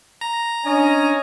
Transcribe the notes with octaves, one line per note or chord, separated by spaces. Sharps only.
A#5
C#4 D4 D#5 G#5